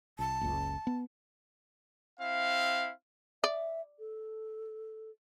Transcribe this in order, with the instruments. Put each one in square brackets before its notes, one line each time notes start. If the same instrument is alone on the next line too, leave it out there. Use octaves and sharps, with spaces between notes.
[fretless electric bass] C2 [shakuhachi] A5
[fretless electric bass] F#1 C#2
B3
[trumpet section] C4 E4 F5
[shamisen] D5 [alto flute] E5
[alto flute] A4